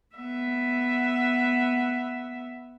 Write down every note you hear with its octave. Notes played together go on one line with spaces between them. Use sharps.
B3 E5